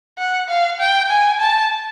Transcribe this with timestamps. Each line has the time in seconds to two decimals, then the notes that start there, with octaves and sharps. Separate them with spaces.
0.18 F#5
0.49 F5
0.80 G5
1.10 G#5
1.40 A5